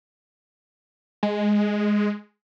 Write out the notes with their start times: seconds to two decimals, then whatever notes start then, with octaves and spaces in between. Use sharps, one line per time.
1.23 G#3